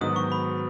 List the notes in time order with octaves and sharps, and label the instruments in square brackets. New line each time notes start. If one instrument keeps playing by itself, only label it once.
[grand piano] G#2 D#3 F#3 B3 F#4 [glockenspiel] D#6
[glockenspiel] C#6
B5